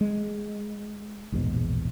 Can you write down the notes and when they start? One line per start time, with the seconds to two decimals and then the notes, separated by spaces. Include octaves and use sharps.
0.01 G#3
1.32 A#1 E2 G#2 B2